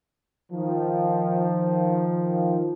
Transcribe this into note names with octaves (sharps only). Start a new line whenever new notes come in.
D#3 F3